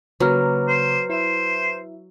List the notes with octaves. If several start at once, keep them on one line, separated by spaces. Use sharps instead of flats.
C#3 F#3 A#3 B4 A#5 D6 F6
C5
E4 C5 E5